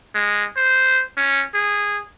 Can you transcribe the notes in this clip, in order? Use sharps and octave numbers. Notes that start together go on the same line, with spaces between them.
G#3
C5
C#4
G#4